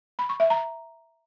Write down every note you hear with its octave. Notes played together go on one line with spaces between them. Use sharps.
B5
C#6
E5
A#5